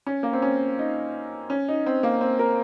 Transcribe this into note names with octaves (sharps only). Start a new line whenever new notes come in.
C#4
A#3
C4
C#4
D#4
C#4
D#4
C4
A#3
C4
A#4